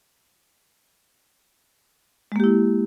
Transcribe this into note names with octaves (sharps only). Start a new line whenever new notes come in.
G#3 A#3 E4 G4